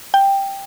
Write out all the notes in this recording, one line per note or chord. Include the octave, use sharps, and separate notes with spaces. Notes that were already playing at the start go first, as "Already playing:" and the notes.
G5